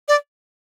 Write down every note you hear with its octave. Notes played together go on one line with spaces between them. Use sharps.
D5